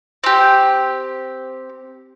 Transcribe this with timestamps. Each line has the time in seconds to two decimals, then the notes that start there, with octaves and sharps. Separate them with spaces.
0.24 C4 G4